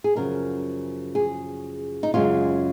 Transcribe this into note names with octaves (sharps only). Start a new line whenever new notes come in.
G#4
F#2 C#3 F3 A#4
G#4
D#4
F#2 C#3 G#3 F4